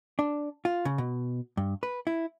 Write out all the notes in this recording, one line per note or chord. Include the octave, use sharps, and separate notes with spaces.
D4
F4
C#3
B2
G2
B4
E4